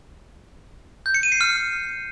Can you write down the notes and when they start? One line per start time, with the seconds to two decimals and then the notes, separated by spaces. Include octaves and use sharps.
1.06 G6
1.14 C#7
1.23 D#7
1.32 C7
1.41 F6